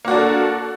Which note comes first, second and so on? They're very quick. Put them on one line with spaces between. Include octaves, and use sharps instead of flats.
A#3 F#4 D4 A4